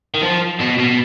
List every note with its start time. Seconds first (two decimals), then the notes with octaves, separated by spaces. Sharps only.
0.14 D#3
0.23 F3
0.61 B2
0.79 B2